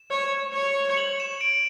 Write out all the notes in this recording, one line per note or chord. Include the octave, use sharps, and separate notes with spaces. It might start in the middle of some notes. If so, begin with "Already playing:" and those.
Already playing: E7
C#5
C#5
F#7
E7
D7